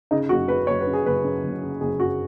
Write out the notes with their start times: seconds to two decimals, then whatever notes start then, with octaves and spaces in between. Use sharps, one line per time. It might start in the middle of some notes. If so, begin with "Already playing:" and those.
0.11 C#3 D#4
0.29 F#1 F#4
0.48 F#2 B4
0.67 F#1 C#5
0.81 B4
0.87 C#3
0.93 G#4
1.06 F#1 B4
1.24 F#2
1.44 F#1
1.62 C#3
1.81 F#1 G#4
2.00 F#2 F#4